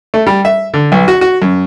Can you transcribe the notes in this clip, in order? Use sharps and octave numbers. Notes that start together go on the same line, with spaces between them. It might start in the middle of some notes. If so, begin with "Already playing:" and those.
A3
G3
E5
D3
B1
F#4
F#4
F#2